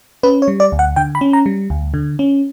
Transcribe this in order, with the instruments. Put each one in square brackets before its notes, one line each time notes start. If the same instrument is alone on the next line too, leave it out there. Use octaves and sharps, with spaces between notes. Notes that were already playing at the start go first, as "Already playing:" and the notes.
[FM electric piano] C#4 B4
C#5
G3
D5
D2
F#5
D3 G5
B5
C#4
A#5
G3
D2
D3
C#4